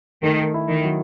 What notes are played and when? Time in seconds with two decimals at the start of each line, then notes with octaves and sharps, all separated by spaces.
0.23 D#3 A3
0.54 E4
0.69 D#3
0.84 F#3